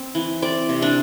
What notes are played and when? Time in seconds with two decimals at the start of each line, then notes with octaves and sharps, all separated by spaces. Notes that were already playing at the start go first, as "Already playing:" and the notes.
Already playing: C4
0.15 E3
0.42 C4 D5
0.69 C3
0.82 D4